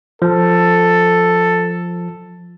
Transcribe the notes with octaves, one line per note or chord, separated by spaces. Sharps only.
F3 A4